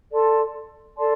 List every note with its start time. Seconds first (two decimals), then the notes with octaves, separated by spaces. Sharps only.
0.12 A4 D5 A5 C6
0.98 A4 D5 A5 C6